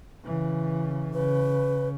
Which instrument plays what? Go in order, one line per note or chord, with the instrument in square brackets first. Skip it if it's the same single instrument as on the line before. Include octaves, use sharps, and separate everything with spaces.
[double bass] C#3 E3
[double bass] C#3 [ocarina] B4